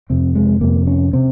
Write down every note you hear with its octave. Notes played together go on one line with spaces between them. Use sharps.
F2 C3 C4
G#3
F2 C3 A#3
C#4
C3 C4